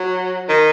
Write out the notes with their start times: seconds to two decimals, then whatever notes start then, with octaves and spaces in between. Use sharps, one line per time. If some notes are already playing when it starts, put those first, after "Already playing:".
Already playing: F#3
0.49 D#3